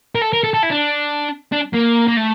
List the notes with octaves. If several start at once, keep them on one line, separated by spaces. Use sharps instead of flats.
A#4
A4
A#4
A4
A4
E4
D4
D4
A#3
A#3
A3